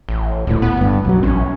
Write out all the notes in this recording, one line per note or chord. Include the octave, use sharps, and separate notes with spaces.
A1
D#1 D2 A2
B3
G1 G2
B1 F#2 F#3
A1 C4 C#4